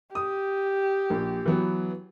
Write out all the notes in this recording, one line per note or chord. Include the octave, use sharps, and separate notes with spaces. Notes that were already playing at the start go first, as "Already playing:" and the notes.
G4 D#6
A#1
E3 F#3 B3